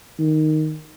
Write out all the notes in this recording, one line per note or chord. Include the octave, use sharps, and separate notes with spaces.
D#3